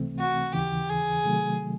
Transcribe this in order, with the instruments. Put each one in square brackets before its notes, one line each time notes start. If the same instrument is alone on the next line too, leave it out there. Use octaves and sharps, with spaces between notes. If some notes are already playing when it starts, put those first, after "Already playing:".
Already playing: [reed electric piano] C#2 C3 E3 A3 C4
[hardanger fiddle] F#4
[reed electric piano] D#2 C#3 E3 [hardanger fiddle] G4
[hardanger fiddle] G#4
[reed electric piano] C3 D#3 F#3 A3